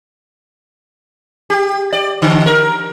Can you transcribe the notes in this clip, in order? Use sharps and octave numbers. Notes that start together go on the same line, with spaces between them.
G4
D5
D3
A#4